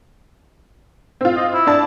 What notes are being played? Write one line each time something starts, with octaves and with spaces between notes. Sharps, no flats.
C4 F4
D#5
E4
D4 D5 A5